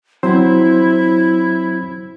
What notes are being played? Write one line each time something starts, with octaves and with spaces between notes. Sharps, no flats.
F#3 C4 E4 C5